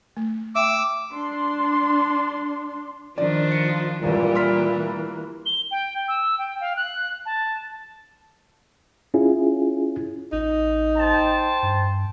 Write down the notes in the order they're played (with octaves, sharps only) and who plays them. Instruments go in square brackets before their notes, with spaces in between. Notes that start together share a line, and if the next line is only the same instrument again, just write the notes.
[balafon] A3
[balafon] E5 G5 [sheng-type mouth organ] D6 E6
[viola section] D4 C6
[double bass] D#3 [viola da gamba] F3 D4 F4 [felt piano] D5
[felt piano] C#7
[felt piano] E1 C#2 [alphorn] A#2 [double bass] E3 A#3 [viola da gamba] G3
[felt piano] C6 F6 B6
[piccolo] G7
G5
E6
G5
F5
F#6
A5
[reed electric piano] C#4 E4 F4 G#4
[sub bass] A1 [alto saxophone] D#4
[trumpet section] C5 G5 A5
[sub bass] G2